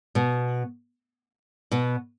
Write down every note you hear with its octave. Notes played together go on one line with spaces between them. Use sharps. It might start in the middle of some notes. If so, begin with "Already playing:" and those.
B2 B3
B2 B3